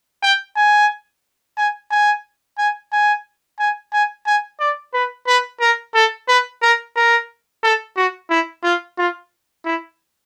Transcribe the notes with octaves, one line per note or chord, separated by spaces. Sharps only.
G5
G#5
G#5
G#5
G#5
G#5
G#5
G#5
G#5
D5
B4
B4
A#4
A4
B4
A#4
A#4
A4
F#4
E4
F4
F4
E4